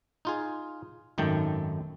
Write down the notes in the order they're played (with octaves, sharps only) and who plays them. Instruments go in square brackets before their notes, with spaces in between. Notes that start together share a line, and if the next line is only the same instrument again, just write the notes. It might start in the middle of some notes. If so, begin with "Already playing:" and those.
[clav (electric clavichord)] D#4 F4 G#4
G#1 F#2 D#3 A3 G5 A5